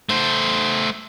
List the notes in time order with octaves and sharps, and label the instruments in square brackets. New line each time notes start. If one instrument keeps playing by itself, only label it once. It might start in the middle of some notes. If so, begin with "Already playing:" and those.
[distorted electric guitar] A3 C5